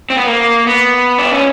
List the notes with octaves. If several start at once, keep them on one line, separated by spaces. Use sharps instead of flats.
C4
B3
A#3
B3
D4
C#4